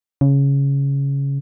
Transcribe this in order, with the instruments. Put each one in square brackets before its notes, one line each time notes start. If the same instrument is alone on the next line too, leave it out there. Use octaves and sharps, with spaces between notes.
[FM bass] C#3